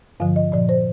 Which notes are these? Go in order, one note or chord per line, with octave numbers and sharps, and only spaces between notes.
G2 D3 F3 F5
D#5
A#2 F3 D5
C5